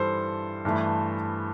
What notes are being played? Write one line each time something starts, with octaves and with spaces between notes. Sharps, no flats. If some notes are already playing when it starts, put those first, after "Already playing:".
Already playing: G2 E3 G3 A4 C5
G2 E3 A3